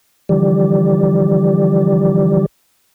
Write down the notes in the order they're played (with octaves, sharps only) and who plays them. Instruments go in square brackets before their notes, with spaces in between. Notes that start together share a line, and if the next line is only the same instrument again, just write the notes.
[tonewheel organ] D3 E3 F3 G3 G4 D5